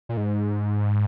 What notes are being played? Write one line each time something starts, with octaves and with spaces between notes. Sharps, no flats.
A#2
G#2